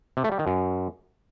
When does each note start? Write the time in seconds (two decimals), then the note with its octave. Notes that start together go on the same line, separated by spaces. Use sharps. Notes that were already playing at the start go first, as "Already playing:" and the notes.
0.17 C3
0.24 A3
0.32 G3
0.39 D#3
0.47 F#2